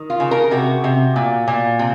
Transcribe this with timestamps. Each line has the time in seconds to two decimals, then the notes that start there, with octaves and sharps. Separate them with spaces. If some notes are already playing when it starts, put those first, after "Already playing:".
Already playing: D#3
0.10 F4
0.20 C#3
0.31 A#4
0.51 C3 F#4
0.84 C3
1.16 A#2
1.48 A#2
1.79 C3